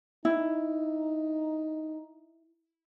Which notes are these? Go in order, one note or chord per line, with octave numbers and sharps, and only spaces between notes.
D#4 E4